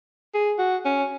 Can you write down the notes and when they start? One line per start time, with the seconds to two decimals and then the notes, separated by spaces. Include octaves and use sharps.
0.34 G#4
0.59 F#4
0.85 C#4